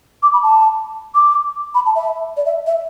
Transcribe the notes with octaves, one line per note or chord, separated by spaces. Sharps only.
D6
B5
A5
D6
B5
A5
E5
D5
E5
E5